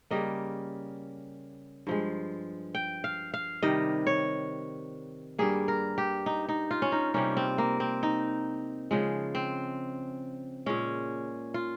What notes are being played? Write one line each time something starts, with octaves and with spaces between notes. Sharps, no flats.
C#3 G3 A#3 D#5
G2 F3 G#3
G5
F5
F5
C3 D#3 G3 D#5
C#5
G2 G3 A#3 G#4
A#4
G4
D#4
D#4
F4
C#4
D#4
C3 G3 A#3 C#4
C4
A#3
C4
D#4
C#3 F3 G#3
C4
A#2 G#3 C#4
F4